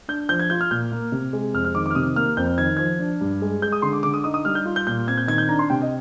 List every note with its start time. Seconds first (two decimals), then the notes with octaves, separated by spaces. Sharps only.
0.08 D4 G6
0.29 F3 G6
0.39 G#6
0.50 F4 G6
0.61 F6
0.71 A#2 G6
0.92 A#3
1.12 C3
1.33 G#3
1.54 F2 F6
1.65 F6
1.75 D#3 D6
1.86 D6
1.91 F6
1.95 C3 D#6
2.16 A#3 F6
2.37 F2 G6
2.58 D#3 G#6
2.77 F3 G#6
2.99 D4
3.21 G2
3.42 G#3
3.62 G#3 G6
3.72 D#6
3.82 D3 C6
3.93 D6
4.03 D3 D6
4.14 D#6
4.24 D#4 D#6
4.34 D#6
4.45 G3 F6
4.55 G6
4.65 F4
4.76 G6
4.87 A#2 G6
5.07 C4 G#6
5.18 G6
5.28 D#3 G#6
5.38 G6
5.48 D4 A#5
5.59 C6
5.70 C3 G5
5.82 D#5